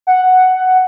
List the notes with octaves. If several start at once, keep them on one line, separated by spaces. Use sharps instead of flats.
F#5